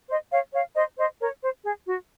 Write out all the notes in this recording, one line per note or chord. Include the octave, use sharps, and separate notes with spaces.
C5 D#5
C#5 F5
C#5 F5
C5 D#5
C5 D#5
A#4 C#5
C5
G#4
F#4